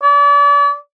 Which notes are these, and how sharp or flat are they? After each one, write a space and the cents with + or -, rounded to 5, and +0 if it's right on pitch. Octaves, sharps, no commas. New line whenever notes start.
D5 -40